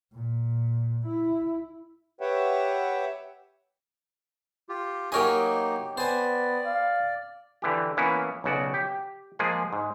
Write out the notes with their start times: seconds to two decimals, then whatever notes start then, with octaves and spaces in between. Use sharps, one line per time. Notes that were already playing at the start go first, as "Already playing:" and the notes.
0.13 A#2
1.06 E4
2.21 G4 B4 C#5 E5 F#5 G5
4.69 F4 G4
5.12 F#3 A#3 D#4 G4 A#4 C#5 D#5 G#5
5.97 B3 C5 D5 G#5
6.66 F5
7.62 D3 E3 G4
7.97 E3 A#3 B3 C#4 E4
8.44 B1 C#3 F#4 D5
8.74 G4
9.39 F3 G#3 A#3 G#4
9.73 G#2